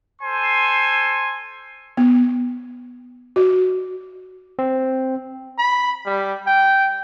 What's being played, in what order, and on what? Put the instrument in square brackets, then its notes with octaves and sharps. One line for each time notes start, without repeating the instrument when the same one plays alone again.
[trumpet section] A4 C5 G#5 C6
[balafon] B3
F#4
[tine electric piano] C4
[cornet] B5
G3
G5